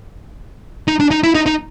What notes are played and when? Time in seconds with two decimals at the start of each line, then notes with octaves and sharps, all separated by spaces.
0.88 D#4
1.00 D4
1.11 D#4
1.23 E4
1.35 D#4
1.46 D#4